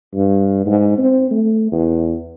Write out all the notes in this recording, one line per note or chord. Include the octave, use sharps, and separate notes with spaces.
G2
G#2
C4
A3
E2